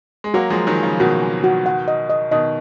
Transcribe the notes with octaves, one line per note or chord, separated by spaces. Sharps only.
G#3
F#3 A#3 F#4
F3 G#3
G#5
D#3 F#3
G#5
C#3 F3
B2 D#3 F#4
G#5
F#4
F#5
D#5
D#5
B2 D#3 D#5